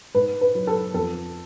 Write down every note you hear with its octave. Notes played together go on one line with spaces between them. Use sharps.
G#2 B4
B4
F#3
A4
F2 A4